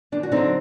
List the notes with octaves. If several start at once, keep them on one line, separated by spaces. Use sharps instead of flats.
D#2 D4
F#4
D3 F#3 C4 D#4